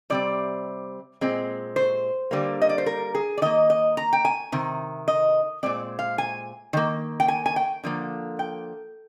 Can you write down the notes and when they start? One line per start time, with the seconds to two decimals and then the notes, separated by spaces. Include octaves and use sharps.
0.10 C3 G3 C4 D5
1.21 A#2 G#3 C4
1.76 C5
2.31 D3 G3 A#3
2.62 D#5
2.69 D5
2.78 C5
2.86 A#4
3.15 G#4
3.38 D5
3.42 D#3 A#3 D#5
3.70 D#5
3.97 A#5
4.13 G5
4.25 G#5
4.52 C3 D#3
5.08 D#5
5.63 A#2 G#3 C4 D5
5.99 F5
6.18 G#5
6.73 D#3 A#3
7.20 G5
7.28 G#5
7.46 G#5
7.56 G5
7.84 D3 F3 A#3
8.39 G5